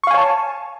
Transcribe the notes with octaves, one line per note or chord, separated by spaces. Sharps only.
C#5 F5 G#5 A5 C#6